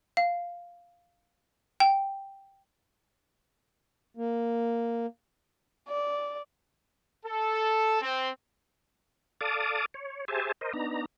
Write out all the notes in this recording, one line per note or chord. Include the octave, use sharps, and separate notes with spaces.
F5
G5
A#3
D5
A4
C4
A4 D5 F5 A5 D6 D#6
C#5
G4 G#4 C5 E5 G#5 A5
A#4 C5 D#5
B3 D4 D#4 A#5